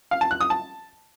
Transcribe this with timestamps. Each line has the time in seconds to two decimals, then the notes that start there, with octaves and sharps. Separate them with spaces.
0.11 F5
0.21 A5
0.31 F#6
0.40 D#6
0.50 A5